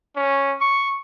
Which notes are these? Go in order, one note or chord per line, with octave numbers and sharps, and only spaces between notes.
C#4
C#6